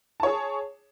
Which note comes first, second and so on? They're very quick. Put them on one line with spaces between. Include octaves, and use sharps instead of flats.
A5 C#5 G#4